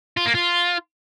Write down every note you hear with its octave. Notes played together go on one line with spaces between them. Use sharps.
F4
A#3
F4